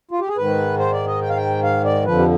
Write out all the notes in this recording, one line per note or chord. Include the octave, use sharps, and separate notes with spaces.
F4
G4
G#4
G#2 D#3 B4
C5
D5
D#5
G5
F5
G5
F5
D5
F2 D3 F3 B4
G4